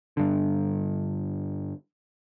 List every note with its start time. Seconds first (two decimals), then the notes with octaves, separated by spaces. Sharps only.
0.17 G2 D3